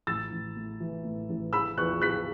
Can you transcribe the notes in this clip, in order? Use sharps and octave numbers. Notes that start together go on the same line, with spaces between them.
A1 E6 A6
A1
A2
E3
A2
A1
E3 B5 E6
E2 C#6 F#6
E2 F#6 B6